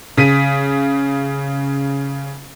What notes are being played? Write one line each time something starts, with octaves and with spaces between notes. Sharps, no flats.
C#3 B6 D#7